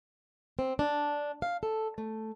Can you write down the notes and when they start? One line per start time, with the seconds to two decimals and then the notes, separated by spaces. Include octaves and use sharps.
0.59 C4
0.79 D4
1.42 F5
1.63 A4
1.98 A3